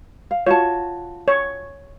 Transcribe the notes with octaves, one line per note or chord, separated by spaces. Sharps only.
F5
F4 F#4 C#5 A5
C#5